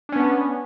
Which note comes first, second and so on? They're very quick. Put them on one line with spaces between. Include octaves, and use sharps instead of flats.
D4 C#4 B3